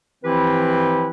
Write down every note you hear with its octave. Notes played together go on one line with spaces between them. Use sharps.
E3 F3 C4 E4 G4 B4